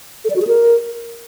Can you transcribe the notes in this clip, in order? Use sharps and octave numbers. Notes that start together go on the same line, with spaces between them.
A4
D5
F#4
G#4
A#4